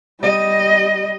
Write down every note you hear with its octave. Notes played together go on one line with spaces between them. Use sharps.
G3 D#5